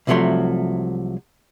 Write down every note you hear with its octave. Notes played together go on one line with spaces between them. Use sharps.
C2 C3 F3 F#3 A3 C6